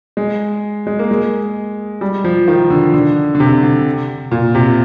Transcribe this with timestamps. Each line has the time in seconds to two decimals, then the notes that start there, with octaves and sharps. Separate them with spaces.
0.17 G#3
0.87 G#3
0.99 A#3
1.11 G#3
2.01 G3
2.24 F3
2.48 D#3
2.70 D3
2.94 D3
3.35 D3
3.40 C3
3.63 D3
4.32 A#2
4.55 C3